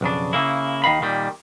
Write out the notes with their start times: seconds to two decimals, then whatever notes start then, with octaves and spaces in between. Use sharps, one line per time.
0.01 B1 F2 C#3 D4
0.33 C#3 A#3 E4
0.84 D#2 D#3 D#5 F5 B5
1.01 A#2 D#3 G3